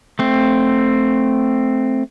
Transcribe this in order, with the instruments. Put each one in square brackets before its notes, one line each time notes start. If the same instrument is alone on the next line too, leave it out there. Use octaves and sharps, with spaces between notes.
[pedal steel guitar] A3 C4